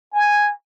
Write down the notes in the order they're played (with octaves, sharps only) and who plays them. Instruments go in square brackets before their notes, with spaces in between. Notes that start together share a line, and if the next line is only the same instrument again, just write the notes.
[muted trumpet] G#5